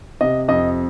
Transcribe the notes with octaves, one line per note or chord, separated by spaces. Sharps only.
C3 D#5
F2 D#5